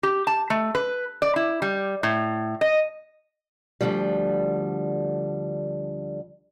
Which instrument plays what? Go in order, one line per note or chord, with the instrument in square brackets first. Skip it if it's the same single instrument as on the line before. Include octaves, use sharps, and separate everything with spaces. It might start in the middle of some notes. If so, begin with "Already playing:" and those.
[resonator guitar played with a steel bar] G4
A5
A3
B4
D5
E4
G3
A2
D#5
[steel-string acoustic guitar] D2 G2 D3 F3 G3